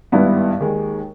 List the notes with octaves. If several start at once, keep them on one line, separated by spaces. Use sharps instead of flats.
G#1 G2 G3 B3 E4
D#2 D#3 G#3